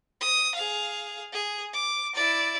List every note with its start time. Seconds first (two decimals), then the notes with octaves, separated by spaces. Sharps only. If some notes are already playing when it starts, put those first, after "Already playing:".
0.21 D#6
0.55 G#4 F5
1.33 G#4
1.73 D6
2.15 E4 D5